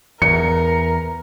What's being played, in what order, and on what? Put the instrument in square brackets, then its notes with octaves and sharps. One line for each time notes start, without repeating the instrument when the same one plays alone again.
[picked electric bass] E2 [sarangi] A#4 [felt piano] C#7